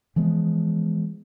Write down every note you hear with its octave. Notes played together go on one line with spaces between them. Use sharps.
E3 F3 G#3 B3